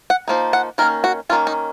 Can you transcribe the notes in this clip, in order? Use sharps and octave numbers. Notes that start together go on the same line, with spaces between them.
F#5
F3 A#3 D#4
F#5
D#3 A#3 C#4 A#4
F#4
D#3 A#3 C#4 F4
D#4